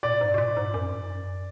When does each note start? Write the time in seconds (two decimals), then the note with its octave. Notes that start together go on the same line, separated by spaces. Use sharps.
0.03 A#2 D5
0.21 G#2
0.34 B2
0.38 A#2
0.57 G#2
0.74 F#2